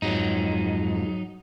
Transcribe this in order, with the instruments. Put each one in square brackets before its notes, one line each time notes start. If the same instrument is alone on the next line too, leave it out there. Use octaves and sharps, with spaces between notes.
[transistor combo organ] F2 G#2 [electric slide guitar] F#3 D#4